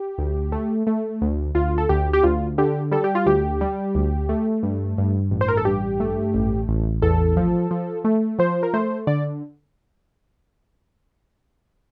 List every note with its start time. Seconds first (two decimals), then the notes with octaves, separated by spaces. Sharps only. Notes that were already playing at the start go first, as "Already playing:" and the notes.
Already playing: G4
0.18 D2
0.52 A3
0.87 A3
1.21 D2
1.55 D2 F4
1.78 A4
1.89 D2 G4
2.13 G4
2.24 D2 F4
2.58 D3 G4
2.92 G3 A4
3.04 G4
3.15 F4
3.26 D2 G4
3.61 G3
3.95 D2
4.29 A3
4.63 G2
4.98 G2
5.31 A1
5.41 C5
5.48 A#4
5.57 A4
5.65 G2 G4
6.00 A3
6.34 A1
6.68 A1
7.02 E2 A4
7.37 F3
7.71 F3
8.05 A3
8.39 F3 C5
8.63 A#4
8.74 A3 C5
9.07 D3 D5